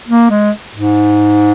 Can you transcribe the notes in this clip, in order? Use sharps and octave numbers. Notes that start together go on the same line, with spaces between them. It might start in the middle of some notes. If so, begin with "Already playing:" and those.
A#3
G#3
G#2